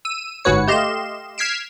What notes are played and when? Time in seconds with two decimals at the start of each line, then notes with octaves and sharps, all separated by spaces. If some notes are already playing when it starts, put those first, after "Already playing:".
0.05 E6 D#7
0.44 G1 G#2 F#4 B4 C#5 C#7
0.68 A3 G4 D#5 F5 C6 E7
1.38 F6 G#6 B6 C7 D7 E7